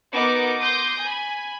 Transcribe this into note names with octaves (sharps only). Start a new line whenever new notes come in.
B3 D#4 F#4 A#4 B4 D6
C6 D6 D#6 G6 A#6
G#5 B5